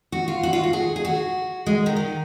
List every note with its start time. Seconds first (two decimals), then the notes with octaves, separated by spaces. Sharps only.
0.12 F#4
0.28 F4
0.43 F#4
0.53 F4
0.63 F#4
0.73 G#4
0.96 G#4
1.05 F#4
1.66 G#3
1.86 D#3
1.96 D#3